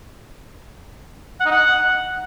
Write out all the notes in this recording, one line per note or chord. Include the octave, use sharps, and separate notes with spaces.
F#5
D#4
F#5